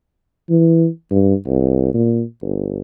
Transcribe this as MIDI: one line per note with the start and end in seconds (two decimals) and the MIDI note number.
0.50 0.88 52
1.11 1.34 43
1.47 1.92 36
1.94 2.23 46
2.41 2.81 31